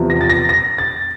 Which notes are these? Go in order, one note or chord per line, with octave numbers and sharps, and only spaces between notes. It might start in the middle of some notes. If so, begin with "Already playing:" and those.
Already playing: E2 C3 F3
A#6
A6
A#6
A#6
A6